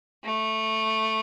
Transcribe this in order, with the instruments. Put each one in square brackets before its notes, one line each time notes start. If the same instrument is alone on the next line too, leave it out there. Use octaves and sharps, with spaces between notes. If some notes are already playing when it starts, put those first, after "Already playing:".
[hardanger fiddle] A3